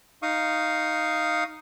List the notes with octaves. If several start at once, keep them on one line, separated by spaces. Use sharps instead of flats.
D#4 F5 C#6 D#6